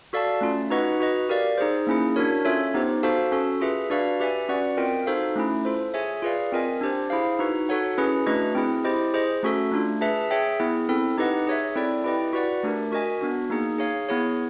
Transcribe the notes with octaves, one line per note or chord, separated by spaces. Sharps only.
F#4 A4 D5 F5 A5
A3 C#4 F4
D#4 F#4 B4 D#5 F#5
F#4 B4 D#5
G4 A#4 D5 F5
D#4 G#4 C5
A#3 C#4 E4 G#4
D4 F#4 A#4 C#5
C#4 F4 A4 C#5 E5
B3 D#4 G4 C5
F#4 A4 C5 F5 A5
C#4 F#4 A4
F4 G#4 B4 E5
D4 F#4 B4 D5 F5
G4 B4 E5 G#5
C#4 F#4 B4 D5 F#5
C4 F4 A#4 D#5 G5
D#4 F#4 A4 C5 F5
A3 C#4 E4
F4 A4 C5
G#4 C#5 E5 G#5
F4 G#4 B4 D5 F5
C4 F4 A#4 D#5 G#5
D4 G4 C5
E4 G#4 C5 F5
D#4 F#4 B4
F#4 A4 C#5 F#5
C#4 E4 G#4 B4
A3 D4 F#4 B4 D#5
C4 E4 G#4
E4 G4 C5 D#5
G#4 C5 D#5
A3 C#4 F#4 A4
A3 D4 F4
G#4 B4 E5 A5
G#4 C#5 E5 G5
B3 E4 G#4
C4 E4 A4
D#4 G4 B4 D#5 F#5
G#4 C#5 E5
C4 E4 A4 D5
E4 G4 B4 D#5 G5
F#4 B4 D5 F#5
A3 D4 G4 A#4
F#4 A#4 D#5 G#5
B3 D4 F#4
A#3 D#4 G#4
G#4 C#5 F5
B3 E4 G#4 C#5